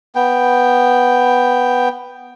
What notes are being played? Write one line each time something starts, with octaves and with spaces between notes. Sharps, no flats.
B3 G5